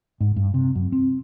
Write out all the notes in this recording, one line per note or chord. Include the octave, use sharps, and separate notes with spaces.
G#2
G2
C3
F#2
C4